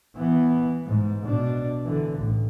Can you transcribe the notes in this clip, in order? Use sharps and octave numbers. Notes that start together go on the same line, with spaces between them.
E3 B3
G#2
B2 D4
D3 E3
A1